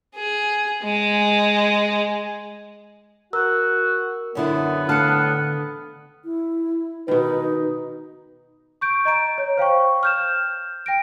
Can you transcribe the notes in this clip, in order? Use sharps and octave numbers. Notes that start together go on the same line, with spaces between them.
G#4
G#3
F#4 A#4 E6
F#2 D3 B3 E4
A2 D3 F5 A5 F6 F#6 C#7
E4
B2 D#3 D#4 B4
C#6 G6 D7
D#5 A#5 D7
C#5
C5 F5 G5 C#6
F6 G6 E7
G5 A#6 D7